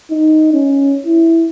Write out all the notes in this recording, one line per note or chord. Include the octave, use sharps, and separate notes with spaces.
D#4
C#4
E4